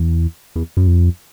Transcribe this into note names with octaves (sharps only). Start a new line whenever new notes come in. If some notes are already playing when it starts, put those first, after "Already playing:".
Already playing: E2
E2
F#2
F2